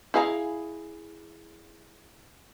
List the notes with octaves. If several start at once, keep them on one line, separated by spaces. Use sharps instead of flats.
E4 G#4 F5 F#5 A#5